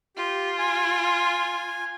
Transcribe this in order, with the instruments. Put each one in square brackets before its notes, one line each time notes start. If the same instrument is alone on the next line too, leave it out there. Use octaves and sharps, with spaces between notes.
[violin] F4 [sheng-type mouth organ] G4
[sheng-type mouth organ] G#5